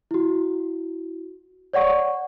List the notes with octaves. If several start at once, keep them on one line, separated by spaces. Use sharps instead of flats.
E4 F#4
C#5 D5 F#5 C#6